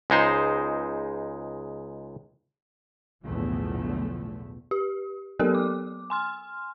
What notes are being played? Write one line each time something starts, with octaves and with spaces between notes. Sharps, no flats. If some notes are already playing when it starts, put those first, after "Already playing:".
C#2 G#3 D#4 C5
B1 E2 A2 D3 F3 A3
G4
F#3 B3 G4 A4 A#4
D6
G#5 C6 F6